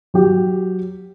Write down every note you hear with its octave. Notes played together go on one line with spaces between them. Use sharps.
F#3 G4